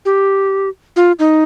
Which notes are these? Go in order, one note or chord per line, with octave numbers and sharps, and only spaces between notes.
G4
F4
D#4